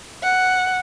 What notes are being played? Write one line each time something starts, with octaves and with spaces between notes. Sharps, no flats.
F#5